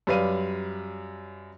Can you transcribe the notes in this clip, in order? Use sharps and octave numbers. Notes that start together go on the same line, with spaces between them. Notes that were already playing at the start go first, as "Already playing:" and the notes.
F#2 G3 B4 D5 F5 D#7